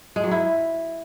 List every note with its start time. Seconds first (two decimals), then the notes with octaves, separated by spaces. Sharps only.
0.16 G#3
0.24 F#3
0.31 E4